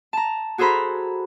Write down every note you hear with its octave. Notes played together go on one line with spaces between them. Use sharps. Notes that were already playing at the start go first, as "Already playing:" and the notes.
A5 A#5
F#4 G#4 A4 C5 A#5 B5